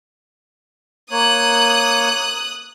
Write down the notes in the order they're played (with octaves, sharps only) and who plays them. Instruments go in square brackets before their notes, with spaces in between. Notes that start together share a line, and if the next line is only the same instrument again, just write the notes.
[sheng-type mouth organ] A#3 C#5 [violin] D#6 F#6